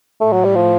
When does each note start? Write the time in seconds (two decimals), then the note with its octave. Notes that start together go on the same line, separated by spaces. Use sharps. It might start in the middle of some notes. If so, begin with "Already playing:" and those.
0.21 A2 A3
0.33 F#3
0.45 G3
0.55 F3